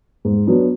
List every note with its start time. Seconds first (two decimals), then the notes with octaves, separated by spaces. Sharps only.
0.25 G#2
0.47 F#3 B3 D4